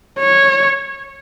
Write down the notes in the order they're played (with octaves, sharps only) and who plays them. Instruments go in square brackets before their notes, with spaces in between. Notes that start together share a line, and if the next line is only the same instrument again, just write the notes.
[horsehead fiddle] C#5